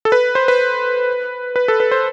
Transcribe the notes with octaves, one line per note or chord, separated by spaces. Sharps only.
A4
B4
C5
B4
B4
A4
B4
C5